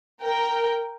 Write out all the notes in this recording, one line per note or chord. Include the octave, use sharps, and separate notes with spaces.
A#4 G5